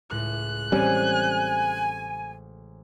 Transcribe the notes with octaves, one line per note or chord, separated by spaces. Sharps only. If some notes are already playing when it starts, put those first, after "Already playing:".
C#2 A2 F#6
A1 G3 C4 C#4 A4 C5 G#5